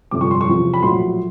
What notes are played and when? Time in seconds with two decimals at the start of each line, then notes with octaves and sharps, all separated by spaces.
0.11 G1 F2 C3 D6
0.21 C#6
0.31 C6
0.41 C#6
0.47 E2 C3 F3
0.74 B5
0.82 A#1 A2 F#3 C6